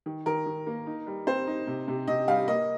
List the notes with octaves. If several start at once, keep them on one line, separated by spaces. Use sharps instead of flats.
D#3
D#3 A#4
D#3
A#3
D#4
G3
C4 C5
D#4
C3
C3
C3 D#5
G3 F5
A#3 D#5